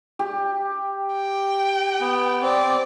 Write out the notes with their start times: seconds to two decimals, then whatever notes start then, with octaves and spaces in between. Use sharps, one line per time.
0.19 G4
1.14 G5
2.00 B3
2.42 C4 D5